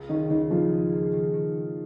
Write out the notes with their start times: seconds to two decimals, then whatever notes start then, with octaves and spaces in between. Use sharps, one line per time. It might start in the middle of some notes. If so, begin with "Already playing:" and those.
Already playing: C#2
0.09 D#3 C#4 D#4
0.30 C#2 D#3 D#4
0.51 C#2 F3 F4
0.72 G#4
0.92 A#3
1.13 D#3
1.34 D#3